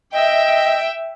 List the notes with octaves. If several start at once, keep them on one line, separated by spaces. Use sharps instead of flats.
D#5 E5 G5